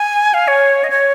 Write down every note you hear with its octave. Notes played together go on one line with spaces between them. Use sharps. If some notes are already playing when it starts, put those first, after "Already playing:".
Already playing: G#5
F5
C#5
D#5
C#5